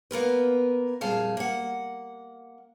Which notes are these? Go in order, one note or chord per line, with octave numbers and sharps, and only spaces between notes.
A#3 B3 A#4 B4
F2 A#2 G3 G#4 F5 A5
A#3 F#5